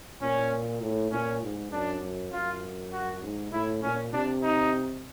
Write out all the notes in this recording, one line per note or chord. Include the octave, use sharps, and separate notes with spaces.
A#2 C#4
A2
A#2 C#4
G#2
F#2 D4
F#2
F#2 F4
F#4
G#2
A2 E4
A#2 C#4
C3 D4
D#4